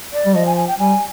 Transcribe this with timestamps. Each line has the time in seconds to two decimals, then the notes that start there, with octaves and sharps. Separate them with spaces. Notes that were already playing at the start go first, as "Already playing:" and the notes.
0.13 D5
0.25 G3
0.35 F3 D#5
0.46 G#5
0.57 G#5
0.67 G5
0.78 G3 G#5